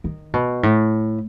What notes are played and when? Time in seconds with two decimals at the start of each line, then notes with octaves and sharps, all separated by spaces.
0.04 D#3
0.34 B2
0.63 A2